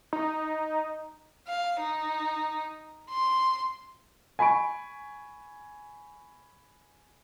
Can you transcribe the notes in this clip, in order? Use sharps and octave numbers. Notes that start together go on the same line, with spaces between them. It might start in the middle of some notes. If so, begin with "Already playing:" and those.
D#4
F5
D#4
C6
G#5 B5 C#6 D7